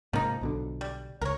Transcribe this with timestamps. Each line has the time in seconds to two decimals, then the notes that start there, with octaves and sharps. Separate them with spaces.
0.13 G#2 C3 F3 A#3 D#4
0.41 B1 B2 D3
0.81 G3
1.21 C#2 A#4 C#5